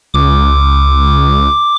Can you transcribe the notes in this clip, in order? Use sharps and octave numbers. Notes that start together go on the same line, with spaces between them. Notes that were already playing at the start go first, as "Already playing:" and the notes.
C#2 D6